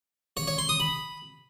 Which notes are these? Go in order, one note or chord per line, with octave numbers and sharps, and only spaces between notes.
C#5
C#5
C6
D#6
B5